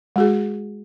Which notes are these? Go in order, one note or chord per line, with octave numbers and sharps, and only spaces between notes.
G#3 F#4 G#4